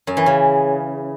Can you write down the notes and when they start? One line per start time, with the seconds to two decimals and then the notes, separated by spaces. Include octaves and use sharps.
0.07 F#2
0.17 E3
0.26 C#3